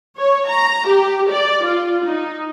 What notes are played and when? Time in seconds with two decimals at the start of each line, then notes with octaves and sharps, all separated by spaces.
0.17 C#5
0.49 A#5
0.88 G4
1.30 D5
1.64 F4
2.05 D#4